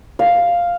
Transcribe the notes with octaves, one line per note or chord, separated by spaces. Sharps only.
F5